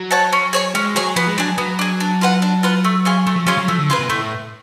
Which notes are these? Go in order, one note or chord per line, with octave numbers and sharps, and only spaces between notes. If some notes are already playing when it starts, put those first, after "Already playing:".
Already playing: F#3
C#5 F#5 A5
C#4
G#4 C#5 G#5
G#3 C#4
F#3 G#4 C#5 G#5
F3 B3
G#3
F#3 D4 G#4
F#3 B3
D4 G#4
D4
F4 B4 F#5
D4
F4 B4 F#5
A3
C#4 F4 G#4
F#3 A3
F3
F#3 C#4 F4 G#4
F#3
F3 A3
D3
C#3 F4 G#4 B4
B2
A2 A3